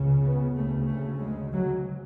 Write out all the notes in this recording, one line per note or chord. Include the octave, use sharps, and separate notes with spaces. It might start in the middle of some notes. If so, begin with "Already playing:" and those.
Already playing: C#2 C#3
B3
D2 C#3 A3
A3
G#3
F#3